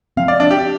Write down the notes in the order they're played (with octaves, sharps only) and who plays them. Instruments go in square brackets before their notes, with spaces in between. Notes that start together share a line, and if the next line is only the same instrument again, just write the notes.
[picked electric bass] F3 C4 [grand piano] F5
[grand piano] D5
D4
G4